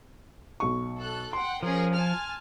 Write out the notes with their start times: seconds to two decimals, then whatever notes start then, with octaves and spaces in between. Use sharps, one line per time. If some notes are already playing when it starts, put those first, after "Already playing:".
0.60 B1 C#6
0.97 A4 F#6
1.33 F#5 G5 C6
1.63 F3 C#4 G#4 A#4
1.94 G#5 A5 F6